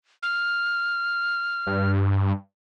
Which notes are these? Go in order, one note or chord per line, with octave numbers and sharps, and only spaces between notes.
F6
G2